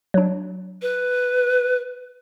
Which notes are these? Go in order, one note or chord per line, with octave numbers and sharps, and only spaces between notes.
F#3 D4
B4